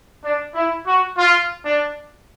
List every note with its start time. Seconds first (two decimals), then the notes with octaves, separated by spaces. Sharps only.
0.23 D4
0.54 E4
0.86 F#4
1.18 F4
1.65 D4